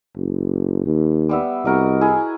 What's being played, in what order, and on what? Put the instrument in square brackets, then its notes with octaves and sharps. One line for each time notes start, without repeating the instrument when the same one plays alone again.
[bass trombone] F#1
D#2
[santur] G3 B3 E5
[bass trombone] C2 [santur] F#4 A#4 D#5
[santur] E4 G#4